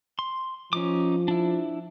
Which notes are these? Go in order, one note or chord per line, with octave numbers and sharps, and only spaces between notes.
C6
F3 C#4 D#4 D6
D4 E4